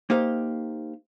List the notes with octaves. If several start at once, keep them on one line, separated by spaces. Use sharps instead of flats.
A#3 D#4 G4 C5 F5